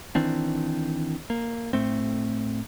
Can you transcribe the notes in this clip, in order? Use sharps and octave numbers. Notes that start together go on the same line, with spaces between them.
D#3 E3 C4 D4
A#3
A2 A3 C4